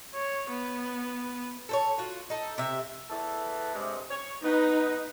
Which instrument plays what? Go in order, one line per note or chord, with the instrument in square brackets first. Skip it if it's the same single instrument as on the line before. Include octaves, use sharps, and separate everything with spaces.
[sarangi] C#5
B3
[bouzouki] A4 C5 C#5
F4 F#4
D#4 A4
C3 E5
[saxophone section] E2 E3 A4
G2 C3 G#3
C#5
[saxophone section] B3 B4 [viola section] D#4